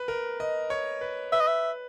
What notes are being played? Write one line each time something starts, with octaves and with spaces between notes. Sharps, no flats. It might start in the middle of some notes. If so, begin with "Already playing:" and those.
Already playing: B4
A#4
D#5
C#5
B4
B4 E5
D#5
E5